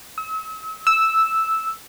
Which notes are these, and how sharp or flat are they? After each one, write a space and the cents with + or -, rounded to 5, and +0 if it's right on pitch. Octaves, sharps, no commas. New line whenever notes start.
E6 -40
E6 -5